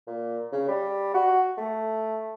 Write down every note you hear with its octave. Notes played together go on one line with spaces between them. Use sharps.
A#2
C#3
G3
F#4
A3